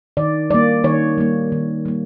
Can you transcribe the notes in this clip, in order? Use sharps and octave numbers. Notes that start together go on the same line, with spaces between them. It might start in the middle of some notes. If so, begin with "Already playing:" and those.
D#3 D5
G3 A#3 D5
D#3 C#5
G3 A#3
D#3
G3 A#3